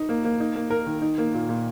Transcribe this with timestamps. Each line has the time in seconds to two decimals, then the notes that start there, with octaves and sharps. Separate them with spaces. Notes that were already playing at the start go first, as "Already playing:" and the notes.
Already playing: D#4
0.09 A#3
0.24 A#3
0.40 D#4
0.56 A#3
0.70 A#4
0.86 D#3
1.02 D#4
1.18 A#3
1.34 A#2
1.49 A#2